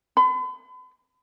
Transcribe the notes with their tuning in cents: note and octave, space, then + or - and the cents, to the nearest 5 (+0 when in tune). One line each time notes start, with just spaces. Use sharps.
B5 +40